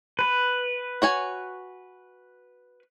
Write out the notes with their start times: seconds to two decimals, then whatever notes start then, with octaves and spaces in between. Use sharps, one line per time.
0.19 B4
1.02 F#4 C#5 G#5